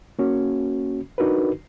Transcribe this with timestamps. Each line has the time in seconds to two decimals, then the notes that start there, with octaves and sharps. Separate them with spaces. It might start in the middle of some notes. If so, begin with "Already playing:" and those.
0.19 A#3 C#4 F#4
1.18 D4 D#4 F#4 A#4 B4